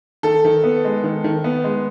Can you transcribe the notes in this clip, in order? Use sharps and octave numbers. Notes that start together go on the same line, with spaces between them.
D#3 A4
D#3
B3
G#3
D#3
D#3
B3
G#3